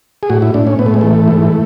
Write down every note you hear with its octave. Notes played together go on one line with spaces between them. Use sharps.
G#4
A2 F#4
E4
A2 D4
C#4
A2 B3
A3
G#3
E3 A3
G#2